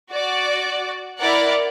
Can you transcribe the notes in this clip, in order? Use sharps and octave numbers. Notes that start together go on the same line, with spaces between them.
F#4 D5
E4 A#4 D5 F#5